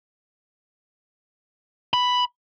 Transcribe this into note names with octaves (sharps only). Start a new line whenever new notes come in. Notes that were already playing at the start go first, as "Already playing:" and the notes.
B5